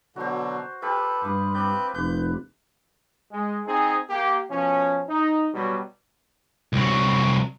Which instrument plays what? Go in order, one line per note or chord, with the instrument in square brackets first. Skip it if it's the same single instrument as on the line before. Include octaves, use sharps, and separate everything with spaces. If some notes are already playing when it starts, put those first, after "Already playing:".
[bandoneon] B2 D3 F#3 [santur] F#4 C5
[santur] F4 G4 [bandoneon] A4 B4
[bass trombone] G2 [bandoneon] B4 [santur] C6 D6 D#6
[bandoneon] C4 B4 G6 [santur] D5
[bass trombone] F1 [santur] B4 D6 [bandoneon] G6
[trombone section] G#3
C4 D#4 G#4
A#3 G4
B2 F3 C#4
D#4
B2 F#3 G3
[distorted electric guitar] C2 F#3